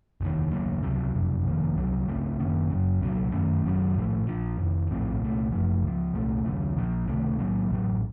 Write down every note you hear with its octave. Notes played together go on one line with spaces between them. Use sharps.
F1 D#2 D#3
D#2 C#3 F#3 A#3
C#2 C3 F#3
F#1 F2 C3 F#3
F1 F2 D#3 A#3
C2 C3 F#3
C#2 C#3 A3 C4
F#2 D#3 A#3 C#4
F#1 F#2 C#3
C2 A#2 F#3
F#2 D#3 A3 C#4
F#1 F#2 D#3 F#3
A1 A2 F3 A3
A#1 A#2 F3
F1 F2 D#3
A#1 A2 F3 C4
C2 A#2 A3
F#1 F#2 F3 A3
C#2 C#3 F3
C2 A#2 A3
D#2 C#3 F#3
A#1 A#2 F3
C#2 C3 D#3 A3
A2 F#3 A#3
A1 A2 F#3